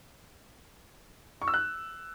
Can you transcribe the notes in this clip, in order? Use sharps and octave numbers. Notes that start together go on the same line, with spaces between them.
C#6
E6
F#6